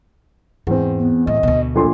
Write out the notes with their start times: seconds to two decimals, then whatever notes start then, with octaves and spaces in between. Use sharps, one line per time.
0.67 E2 G#2 C4
1.00 B3
1.27 A2 D#5
1.43 D2 B2
1.75 A#1 A#2 A4 C6